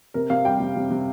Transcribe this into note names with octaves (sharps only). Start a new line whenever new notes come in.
C3 A#4
C3 F5
G3 G5
C3
C3
C3